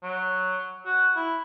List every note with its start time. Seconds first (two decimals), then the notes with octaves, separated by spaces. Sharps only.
0.03 F#3
0.86 F#4
1.16 E4